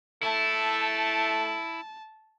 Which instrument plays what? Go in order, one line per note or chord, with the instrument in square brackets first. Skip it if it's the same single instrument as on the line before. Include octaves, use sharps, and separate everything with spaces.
[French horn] A3 [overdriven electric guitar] E4 [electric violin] A5